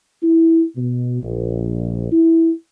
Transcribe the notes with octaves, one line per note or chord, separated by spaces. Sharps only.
E4
B2
A#1
E4